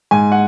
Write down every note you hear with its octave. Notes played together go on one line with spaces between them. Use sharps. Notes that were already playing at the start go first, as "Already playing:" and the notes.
G#2 G#5
F#5